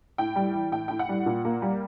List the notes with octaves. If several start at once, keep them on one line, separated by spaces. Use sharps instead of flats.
A2 G5
G3
E3
A2 G5
A2 G5
F#5
G3
A#2
A#3
G3